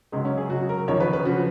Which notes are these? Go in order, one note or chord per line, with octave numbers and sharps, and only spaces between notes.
C#2 C#3 F#3 G#3
C#4
G#4
C#2 C#3 F#3 F#4
A#4
D#2 C#3 F3 C#5
B4
B4
C#3 F3 F#4